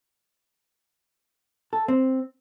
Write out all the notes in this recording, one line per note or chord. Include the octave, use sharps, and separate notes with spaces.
A4
C4